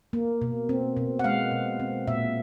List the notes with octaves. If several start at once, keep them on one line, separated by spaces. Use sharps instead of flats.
A#3
B2
C4
B2
F#5
G#3 F5
B2
C4
A#2 E5